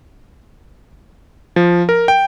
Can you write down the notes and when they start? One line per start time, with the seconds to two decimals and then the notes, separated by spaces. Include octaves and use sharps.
1.56 F3
1.89 A#4
2.08 G5